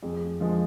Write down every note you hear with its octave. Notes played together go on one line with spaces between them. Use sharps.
F2 G#4
D3 F3 G#3